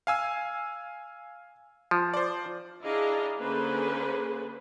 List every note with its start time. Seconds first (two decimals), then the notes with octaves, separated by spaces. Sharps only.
0.07 F5 G#5 E6
1.91 F3
2.14 C5 D5
2.83 D4 E4 G#4 D#5 F5 A#5
3.39 D3 A#3 C#4 G#4 B4 C5